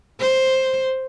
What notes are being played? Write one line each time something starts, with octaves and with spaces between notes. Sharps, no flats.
C5